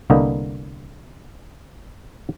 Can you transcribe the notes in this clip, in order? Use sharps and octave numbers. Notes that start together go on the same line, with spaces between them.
C2 D3 A#3 B3 D#5 G5